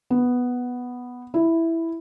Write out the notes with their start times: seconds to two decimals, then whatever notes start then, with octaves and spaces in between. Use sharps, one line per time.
0.10 B3
1.34 E4